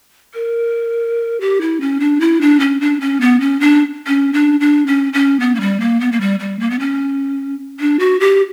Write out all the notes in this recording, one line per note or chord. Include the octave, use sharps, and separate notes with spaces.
A#4
G4
E4
C#4
D4
E4
D4
C#4
D4
C#4
B3
C#4
D4
C#4
D4
D4
C#4
C#4
B3
A#3
G3
A#3
B3
A#3
G3
G3
A#3
B3
C#4
D4
F#4
G4